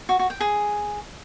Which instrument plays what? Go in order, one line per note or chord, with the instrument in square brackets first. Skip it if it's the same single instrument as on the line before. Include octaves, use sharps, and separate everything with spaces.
[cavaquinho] F#4
F#4
G5
G#4